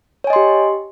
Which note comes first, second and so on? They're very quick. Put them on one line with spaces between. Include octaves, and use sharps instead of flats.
C#5 G#5 D#5 C6 G4